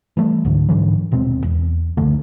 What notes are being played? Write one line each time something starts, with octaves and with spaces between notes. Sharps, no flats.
E3 G3 A3
C#2 G#2 D3
G#2 D3 E3 F#3
D#1 B2 G#3 C4
E2
C#2 F#2 D3 A3